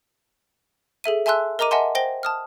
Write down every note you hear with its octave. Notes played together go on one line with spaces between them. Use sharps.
G#4 A4 E5 D#7
E5 G#5 A5 C6 E6 F#6
A#4 D#5 A#5 D6 D#7
D#5 E5 F#5 G#5 A5 C6
C5 G5 A#6 G7
A5 D#6 F6